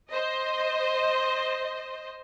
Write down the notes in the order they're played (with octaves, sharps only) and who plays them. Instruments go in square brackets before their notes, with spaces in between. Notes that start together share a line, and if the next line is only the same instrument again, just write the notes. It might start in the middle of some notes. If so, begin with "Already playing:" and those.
[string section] C5 D#5